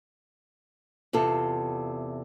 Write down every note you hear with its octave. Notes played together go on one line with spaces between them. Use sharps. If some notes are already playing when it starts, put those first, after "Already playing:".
E2 C3 F4 A4